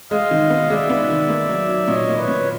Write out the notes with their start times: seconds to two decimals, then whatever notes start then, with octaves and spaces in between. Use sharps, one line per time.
0.11 G#3 D#5 F5
0.31 D#3
0.50 B3
0.70 G#3 D5 E5
0.90 B3
1.10 D#3
1.30 A#3
1.49 F#3
1.69 F#3
1.88 A#2 C#5 D#5
2.09 A#3
2.17 B4 C#5
2.28 A#2